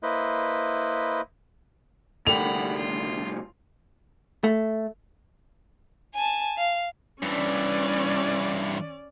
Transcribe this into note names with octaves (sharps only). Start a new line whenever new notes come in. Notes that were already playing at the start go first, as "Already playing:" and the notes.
A#3 E4 B4 C5 D#5
C2 A2 D3 A#3 G4 F#5 B5 F7
F4
A3
G#5 A5
F5
G2 E3 C#4 D5